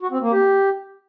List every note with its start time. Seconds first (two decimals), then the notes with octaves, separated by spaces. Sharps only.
0.01 F#4
0.11 C4
0.22 A#3
0.32 G4